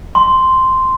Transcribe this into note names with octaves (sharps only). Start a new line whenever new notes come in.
C6